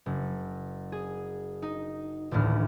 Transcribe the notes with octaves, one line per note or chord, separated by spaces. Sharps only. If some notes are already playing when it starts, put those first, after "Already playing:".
F#1
G#4
D#4
D#1 A1 D2 A2 F6